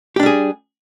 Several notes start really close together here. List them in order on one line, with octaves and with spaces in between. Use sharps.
G4 D4 G3 G#4